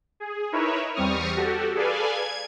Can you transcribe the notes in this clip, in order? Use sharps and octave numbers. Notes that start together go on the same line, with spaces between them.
G#4
D#4 E4 A#4 B4 C#5 E5
E2 G3 C4 C#6 D#6 F6
F#4 G4 A4
G#4 A4 B4 D5 F5 G#5
G#6